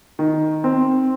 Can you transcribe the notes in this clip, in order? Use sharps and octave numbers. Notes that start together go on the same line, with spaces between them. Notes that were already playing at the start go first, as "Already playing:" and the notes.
D#3
C4